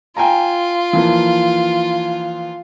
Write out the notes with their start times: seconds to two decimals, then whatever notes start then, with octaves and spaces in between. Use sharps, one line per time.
0.17 F4 G5 G#5 A#5
0.93 E3 F3 A#3